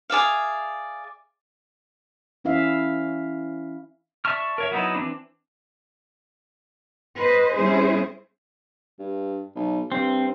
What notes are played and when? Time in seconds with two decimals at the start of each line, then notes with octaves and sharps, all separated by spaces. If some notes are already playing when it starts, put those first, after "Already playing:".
0.10 G#4 D5 E5 F5
2.44 E3 C#4 E4 E5 F5
4.25 D5 E5 A5 C#6 F6
4.58 A#4 C#5 E5
4.71 F#3 B3 D#4 E4
4.95 E3 C4 D4
7.16 B4 C5 D#5
7.53 G3 C4 C#4 E4 G#4 C5
8.99 G2
9.55 B1
9.92 G2 C4